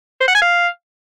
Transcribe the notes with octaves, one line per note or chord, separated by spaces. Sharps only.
C5
F#5
G#5
F5